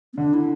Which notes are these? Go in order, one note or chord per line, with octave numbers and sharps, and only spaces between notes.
B3
D3 D4
E4